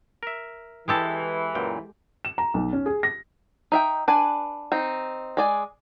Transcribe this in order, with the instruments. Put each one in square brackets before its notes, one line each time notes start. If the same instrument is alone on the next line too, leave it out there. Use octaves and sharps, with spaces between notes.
[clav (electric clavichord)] A#4 E5
[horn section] E3 [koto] G#3 G4 A4
[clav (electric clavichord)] F#2 A#2 G5
[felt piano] E7
A#5
B1
C#4
G#4
A#6
[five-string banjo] D#4 E5 G5
D4 B4 G#5
C4 D#4
G#3 D5 G#5